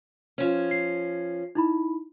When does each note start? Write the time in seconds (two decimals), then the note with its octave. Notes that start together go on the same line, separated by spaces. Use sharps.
0.38 F3 C#4
0.71 C7
1.55 D#4 E4 B5